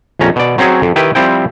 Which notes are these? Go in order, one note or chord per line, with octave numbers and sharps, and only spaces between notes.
A#1 F2 C#4 A#5
B2 D5
F#3 C4 C#4 F#4 G#4
F2
D#3 E4 G4 B4
F3 G3 C4 E4 G5